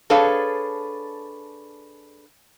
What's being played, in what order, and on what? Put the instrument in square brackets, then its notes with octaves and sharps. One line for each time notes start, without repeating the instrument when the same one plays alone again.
[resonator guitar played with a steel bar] D4 G#4 A4 B4 C#5 F5